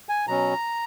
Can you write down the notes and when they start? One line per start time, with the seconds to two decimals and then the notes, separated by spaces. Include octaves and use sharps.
0.09 G#5
0.27 B2 F#3 C#4 A#5